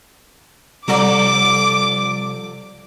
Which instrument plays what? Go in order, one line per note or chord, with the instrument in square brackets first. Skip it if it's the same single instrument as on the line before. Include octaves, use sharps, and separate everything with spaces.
[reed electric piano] C3 G3 [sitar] F3 A4 D5 [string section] D6